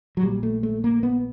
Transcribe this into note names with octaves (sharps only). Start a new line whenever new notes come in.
F#3
A#1 A#2 G3
A3
A3
A#3
B3